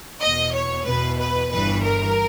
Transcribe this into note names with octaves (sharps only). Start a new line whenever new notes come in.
E2 B2 D#5
C#5
E2 B2 B4
B4
G1 G2 E3 B4
A#4